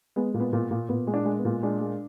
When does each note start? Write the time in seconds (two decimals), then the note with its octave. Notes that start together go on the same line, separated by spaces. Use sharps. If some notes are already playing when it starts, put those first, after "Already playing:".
0.16 G#3 B3
0.34 A#2
0.40 B3
0.53 A#2
0.71 A#2
0.89 A#2 B3
1.07 G#3
1.14 D4
1.25 G#3
1.39 B3
1.45 A#2
1.63 G#3 D4
1.81 G#3